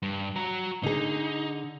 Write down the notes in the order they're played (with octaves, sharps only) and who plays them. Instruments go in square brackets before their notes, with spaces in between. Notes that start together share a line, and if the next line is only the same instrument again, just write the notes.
[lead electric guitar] G2
F#4 A#5
[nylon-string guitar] D3 G#4 [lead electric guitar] D#4